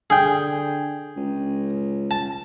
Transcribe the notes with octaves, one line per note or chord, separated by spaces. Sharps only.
D3 G#4 G5
C#2
A5